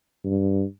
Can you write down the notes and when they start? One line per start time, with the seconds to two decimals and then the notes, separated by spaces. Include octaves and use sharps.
0.25 G2